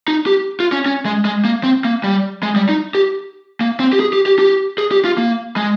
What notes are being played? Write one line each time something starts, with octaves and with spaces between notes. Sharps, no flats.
D#4
G4
F4
C#4
C#4
G#3
G#3
A#3
C4
A#3
G3
G#3
G3
D#4
G4
A#3
C4
G4
G#4
G4
G4
G4
G#4
G4
F4
A#3
G#3